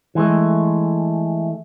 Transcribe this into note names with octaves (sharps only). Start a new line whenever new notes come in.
E3 G#3 A3